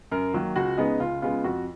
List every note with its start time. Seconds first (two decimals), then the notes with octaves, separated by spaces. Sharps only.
0.12 F#2 A#4
0.34 D#3 F#3 A#3
0.56 C#2 F#4
0.78 C#3 G#3 B3 D#4
1.00 C#2 F4
1.22 C#3 G#3 B3 F4
1.44 F2 F#4